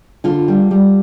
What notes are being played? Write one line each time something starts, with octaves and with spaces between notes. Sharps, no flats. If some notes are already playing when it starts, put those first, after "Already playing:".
D3 F4
G3
G3